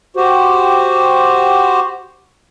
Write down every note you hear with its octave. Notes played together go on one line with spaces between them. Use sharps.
F#4 G4 C5